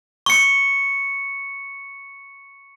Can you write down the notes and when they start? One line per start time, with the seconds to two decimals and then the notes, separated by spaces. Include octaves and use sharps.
0.26 C#6 C#7